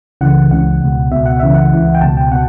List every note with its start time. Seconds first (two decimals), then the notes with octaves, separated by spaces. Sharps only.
0.21 C#2 C#3 E3 F#5
0.51 C#2 C#3 E3 F#5
0.81 C#2 B2
1.11 C#2 B2 E5
1.26 F#5
1.40 C#2 C#3 E3 E5
1.54 F#5
1.72 C#2 C#3 E3
1.95 G5
2.01 C#2 B2 A5
2.17 G5
2.32 B2 F#5